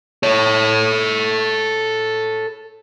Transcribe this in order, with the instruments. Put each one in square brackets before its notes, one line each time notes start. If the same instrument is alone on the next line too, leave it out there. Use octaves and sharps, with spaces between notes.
[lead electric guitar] A4 C#5